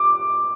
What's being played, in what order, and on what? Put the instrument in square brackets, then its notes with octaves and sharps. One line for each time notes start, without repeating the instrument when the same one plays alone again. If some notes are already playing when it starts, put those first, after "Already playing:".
Already playing: [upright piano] D6